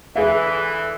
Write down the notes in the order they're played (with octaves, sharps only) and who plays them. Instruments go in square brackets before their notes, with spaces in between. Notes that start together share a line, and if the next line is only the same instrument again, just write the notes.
[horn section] D3 E3 [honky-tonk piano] G#4 E5